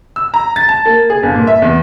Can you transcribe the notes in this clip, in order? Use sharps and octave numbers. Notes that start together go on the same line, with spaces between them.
E6
A#5
A6
A5
A#3
G#4
G1
A#2
E5
E2